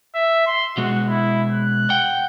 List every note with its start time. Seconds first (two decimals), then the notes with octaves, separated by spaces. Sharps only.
0.15 E5
0.46 C6
0.77 B2 G#3 F#4
1.09 E4
1.51 F#6
1.90 F#5 G5